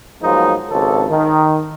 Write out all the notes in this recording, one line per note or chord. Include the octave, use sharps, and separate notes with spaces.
F3 F#3 G#3 A#3 B3 D#4
G#1 C#2 A4
D#3